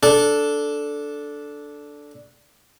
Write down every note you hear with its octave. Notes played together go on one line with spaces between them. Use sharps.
D4 A4